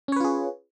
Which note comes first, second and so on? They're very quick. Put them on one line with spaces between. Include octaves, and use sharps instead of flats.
C#4 C#5 B4 F4 G#4